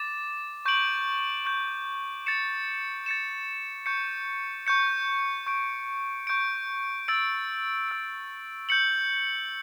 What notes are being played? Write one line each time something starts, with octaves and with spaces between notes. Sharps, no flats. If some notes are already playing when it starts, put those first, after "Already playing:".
Already playing: D6 A6 E7
C#6 G6 D7 F#7
C#6 G6 D7 F#7
A6 C#7 E7
A6 C#7 E7
C#6 G6 C#7
C#6 G6 C#7
C#6 G6 D7
C#6 G6 D7
E6 A6 D7
E6 A6 D7
G6 C#7 F#7